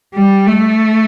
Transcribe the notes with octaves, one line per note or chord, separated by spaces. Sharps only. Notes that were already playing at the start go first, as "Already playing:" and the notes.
G3
A3